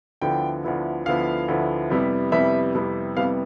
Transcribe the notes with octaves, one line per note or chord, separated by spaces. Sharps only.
D2 D3 F3 B3 E4 G5
D2 D3 F3 B3 E4
D2 D3 F3 B3 E4 F5
D2 D3 F3 B3 E4
F2 C3 G3 B3 E4
F2 C3 G3 B3 E4 E5
F2 C3 G3 B3 E4
F2 C3 G3 B3 E4 F5